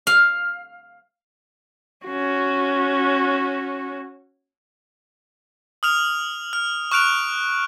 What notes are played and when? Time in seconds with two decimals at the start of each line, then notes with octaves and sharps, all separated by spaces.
0.07 F5
2.06 C#4 F#4
5.83 D#6 F6 F7
6.53 F6
6.92 C#6 F6 F#6 D7 F7